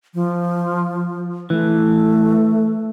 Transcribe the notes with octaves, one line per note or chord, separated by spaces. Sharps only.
F3
E3 A3